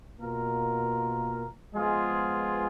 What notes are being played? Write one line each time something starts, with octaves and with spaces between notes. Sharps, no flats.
B2 A#3 F4 A#4
F3 G#3 B3 F4 G#4